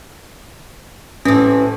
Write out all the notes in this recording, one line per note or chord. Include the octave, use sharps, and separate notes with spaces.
A2 C3 E3 C#4